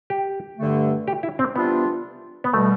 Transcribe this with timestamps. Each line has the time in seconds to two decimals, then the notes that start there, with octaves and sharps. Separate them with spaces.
0.10 G4
0.58 G2 D3 A3
1.08 G4
1.23 E4
1.39 C4
1.56 C3 E3 G3 B3 D4 F4
2.44 B3
2.54 B2 G3 A3